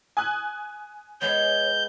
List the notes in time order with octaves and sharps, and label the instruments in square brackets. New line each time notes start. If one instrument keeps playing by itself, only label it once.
[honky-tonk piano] G#5 D#6 F#6
[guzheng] G#3 B3 [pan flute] C#5 [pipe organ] G6